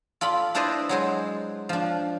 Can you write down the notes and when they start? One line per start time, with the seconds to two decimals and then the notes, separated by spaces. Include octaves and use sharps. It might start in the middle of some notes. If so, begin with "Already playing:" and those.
0.21 F4 A4 D5 B5
0.55 D4 E4 B4 C5 D5 D#5
0.89 F#3 G#3 C5
1.69 F3 D4